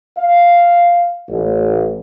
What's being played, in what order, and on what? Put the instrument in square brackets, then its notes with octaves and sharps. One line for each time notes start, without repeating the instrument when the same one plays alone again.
[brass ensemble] F5
A1